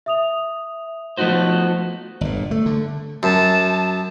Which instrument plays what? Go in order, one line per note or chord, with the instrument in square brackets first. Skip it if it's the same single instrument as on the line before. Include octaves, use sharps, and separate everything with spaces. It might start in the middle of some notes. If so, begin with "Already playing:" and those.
[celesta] E5 D#6 F7
[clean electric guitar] F3 A3 B3 D#4 F#4 C5
[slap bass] G1 A#2
A3
D3
[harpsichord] F#2 [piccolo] A5